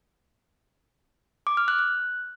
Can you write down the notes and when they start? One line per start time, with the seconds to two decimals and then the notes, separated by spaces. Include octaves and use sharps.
1.47 D6
1.57 F6
1.68 F#6
1.79 F#6